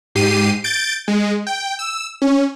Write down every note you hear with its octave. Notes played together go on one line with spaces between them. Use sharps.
G#2 G4 C7 D#7
G6 A6 D7
G#3
G5
E6
C#4